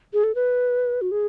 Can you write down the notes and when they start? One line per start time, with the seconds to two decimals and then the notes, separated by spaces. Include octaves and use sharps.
0.13 G#4
0.24 A4
0.35 B4
1.02 F#4
1.11 G#4